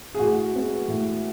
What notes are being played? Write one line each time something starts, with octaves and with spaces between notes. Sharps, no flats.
G#4
A2 F#4
G#3 B3
A2